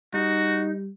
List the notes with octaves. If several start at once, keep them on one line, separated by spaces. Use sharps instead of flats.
G3 D#4 F#4